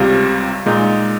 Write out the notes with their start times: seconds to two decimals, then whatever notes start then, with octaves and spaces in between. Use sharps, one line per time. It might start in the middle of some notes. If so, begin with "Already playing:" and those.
Already playing: C#2 C3 G3 C4 F4
0.66 A#2 G#3 D#4